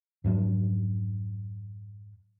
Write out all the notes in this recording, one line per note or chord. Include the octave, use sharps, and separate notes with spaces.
F2 G#2 F#3 D4